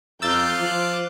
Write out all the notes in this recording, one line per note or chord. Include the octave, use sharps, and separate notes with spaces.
F2 F4 A#5 D6 E6 G6 A6
F3 C5 D6 F#6